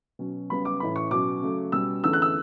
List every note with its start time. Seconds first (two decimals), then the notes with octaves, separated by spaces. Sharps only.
0.19 B2 F#3 C#4
0.50 F#2 C#3 G3 B3 B5
0.65 D6
0.80 A2 E3 A3 C#4 B5
0.96 C#6
1.11 B2 F#3 C#4 D6
1.42 C#3 F#3 A3
1.72 B2 G3 C#4 E6
2.04 E2 D3 A3 C#4 E6
2.13 F#6
2.22 E6